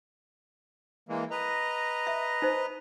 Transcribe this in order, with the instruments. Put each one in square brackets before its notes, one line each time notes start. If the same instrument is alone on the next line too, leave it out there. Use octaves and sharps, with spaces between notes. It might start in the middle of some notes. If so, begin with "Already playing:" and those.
[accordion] E3 G#3 A#3
B4 D#5 A#5
[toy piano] E5
D#4 C5